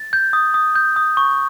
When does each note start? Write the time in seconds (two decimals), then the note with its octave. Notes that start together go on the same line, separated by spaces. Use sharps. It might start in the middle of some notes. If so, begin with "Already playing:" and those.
Already playing: A6
0.13 G6
0.33 D#6
0.54 D#6
0.75 G6
0.96 D#6
1.17 C#6